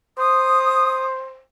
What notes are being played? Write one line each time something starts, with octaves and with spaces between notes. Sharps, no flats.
C5 D#6